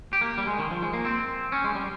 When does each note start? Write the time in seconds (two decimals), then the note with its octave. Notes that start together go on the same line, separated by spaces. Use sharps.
0.13 G4
0.21 A#3
0.38 G3
0.47 G#3
0.59 D#3
0.71 F3
0.83 G#3
0.93 A#3
1.05 C4
1.52 C#4
1.64 G#3
1.75 G3